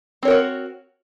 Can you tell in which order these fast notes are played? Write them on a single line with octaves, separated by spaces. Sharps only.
C4 C#5 A#4 F#4